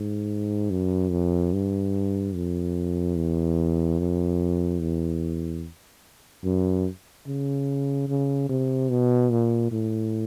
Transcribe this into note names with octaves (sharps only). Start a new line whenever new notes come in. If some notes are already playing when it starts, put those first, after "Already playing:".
Already playing: G#2
F#2
F2
G2
F2
E2
F2
E2
F#2
C#3
C#3
C3
B2
A#2
A2